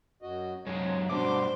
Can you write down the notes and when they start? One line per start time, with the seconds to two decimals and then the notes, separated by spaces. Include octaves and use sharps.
0.22 F#2 F#4 D#5
0.66 F#2 C3 G#3 C#5
1.09 G2 B2 D4 F#4 C5 D6